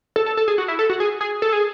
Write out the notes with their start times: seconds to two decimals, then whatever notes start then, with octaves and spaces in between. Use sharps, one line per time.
0.16 A4
0.26 A4
0.37 A4
0.48 G#4
0.58 F#4
0.68 E4
0.79 A4
0.90 F#4
1.00 G#4
1.21 G#4
1.42 A4
1.52 G#4